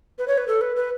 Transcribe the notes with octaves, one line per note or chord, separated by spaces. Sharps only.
B4
C#5
B4
A4
B4
B4